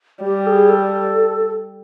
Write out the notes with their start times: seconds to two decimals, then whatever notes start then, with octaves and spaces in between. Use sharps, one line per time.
0.24 G3 G4
0.47 A4
0.50 G#4
0.69 A4